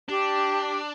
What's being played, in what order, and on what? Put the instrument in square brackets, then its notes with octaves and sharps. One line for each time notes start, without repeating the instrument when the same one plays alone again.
[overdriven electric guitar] D4 [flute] G4